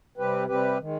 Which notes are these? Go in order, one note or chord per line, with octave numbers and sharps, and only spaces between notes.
C3 G3 C4 G4 B4
C3 G3 C4 G4 B4
D#3 G#3